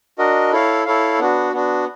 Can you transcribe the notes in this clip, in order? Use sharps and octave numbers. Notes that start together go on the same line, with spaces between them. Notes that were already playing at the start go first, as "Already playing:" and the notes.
D4 F#4 A#4 D#5
E4 A4 C#5 F5
E4 A4 C#5 F5
B3 D4 F#4
B3 D4 F#4